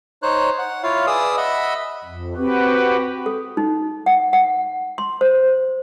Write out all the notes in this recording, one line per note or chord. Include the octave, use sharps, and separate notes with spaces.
D#4 C5 C#5 F#6
F#5
E4 F4 C#5 F5
G#4 B4 D5 D#6 E6
D#5 E5 F#5 B5
F2
C4 F#4 G4 B4
A4
D#4
F#5
F#5
C6
C5